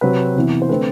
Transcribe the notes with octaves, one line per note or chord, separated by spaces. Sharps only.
C3 F#3 C4 B4
C3 E3 B3
C5
D3 A3 C4 B4